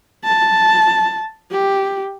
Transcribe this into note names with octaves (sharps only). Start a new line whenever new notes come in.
A5
G4